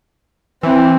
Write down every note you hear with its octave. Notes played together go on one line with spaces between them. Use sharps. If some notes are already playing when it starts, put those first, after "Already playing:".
E3 C4